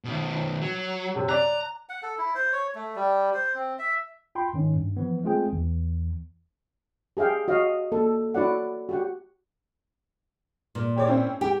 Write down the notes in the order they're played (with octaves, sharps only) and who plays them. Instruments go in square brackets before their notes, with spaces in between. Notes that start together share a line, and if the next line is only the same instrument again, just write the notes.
[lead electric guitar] B2 D#3
F#3
[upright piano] F#2 C3
[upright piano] D5 F#6 [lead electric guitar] A#5
[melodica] F#5
A4
E4
C5
C#5
A3
G3
C5
C4
E5
[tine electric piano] F4 G5 B5 C6
G#2 D#3 C#4 D#4
G2
E3 F3 B3
G#3 A3 C4 F4 G#4 G5
E2 E3
[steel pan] G4 G#4 E5 F5 G5
F#4 D#5 F5
A#3 A4
E4 F#4 D5 F#5
F#4 G4 F#5
[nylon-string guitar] A#2
[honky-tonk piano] G4 C#5 D5
C4 C#4 E4
[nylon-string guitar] G4 [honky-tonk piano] G5